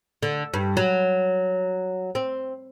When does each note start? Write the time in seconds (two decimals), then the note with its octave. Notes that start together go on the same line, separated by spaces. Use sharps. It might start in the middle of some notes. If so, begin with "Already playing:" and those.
0.23 D3
0.54 G2
0.77 F#3
2.15 C4